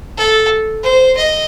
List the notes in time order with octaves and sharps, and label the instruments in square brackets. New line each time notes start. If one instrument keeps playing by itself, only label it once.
[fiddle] A4
C5
D#5